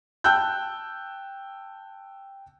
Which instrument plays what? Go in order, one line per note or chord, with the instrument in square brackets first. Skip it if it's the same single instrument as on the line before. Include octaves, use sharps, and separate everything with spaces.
[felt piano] G5 A5 E6 F#6 G6